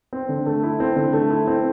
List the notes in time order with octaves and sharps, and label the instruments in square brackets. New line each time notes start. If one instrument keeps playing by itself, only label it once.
[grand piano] C4
D3
A3
E4
C4
D3
A3
E4
C4